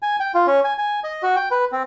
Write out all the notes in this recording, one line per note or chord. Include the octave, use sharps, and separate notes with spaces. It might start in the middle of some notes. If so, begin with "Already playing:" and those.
G#5
G5
F4
C#4
G#5
G#5
D#5
F#4
G5
B4
C4